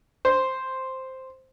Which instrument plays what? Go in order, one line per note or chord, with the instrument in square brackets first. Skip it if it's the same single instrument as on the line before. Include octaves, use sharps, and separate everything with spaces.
[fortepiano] C5